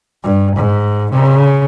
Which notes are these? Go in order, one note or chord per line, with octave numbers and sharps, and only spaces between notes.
G2
G#2
C#3